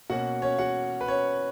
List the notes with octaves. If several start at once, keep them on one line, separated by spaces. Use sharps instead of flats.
B2 A#3 C#4 F#4 F#5
C#4 C#5
F#4 F#5
B4
C#4 C#5